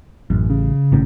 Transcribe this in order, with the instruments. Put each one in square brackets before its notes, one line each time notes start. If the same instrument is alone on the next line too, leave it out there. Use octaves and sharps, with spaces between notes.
[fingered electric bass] A1 [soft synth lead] F#2
[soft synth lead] C#3
[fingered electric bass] G#1 A2 C#4